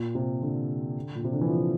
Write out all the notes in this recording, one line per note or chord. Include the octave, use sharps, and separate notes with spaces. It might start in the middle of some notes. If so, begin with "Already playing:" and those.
Already playing: A#2
C3
D3
A#2
C3
D3
E3
F3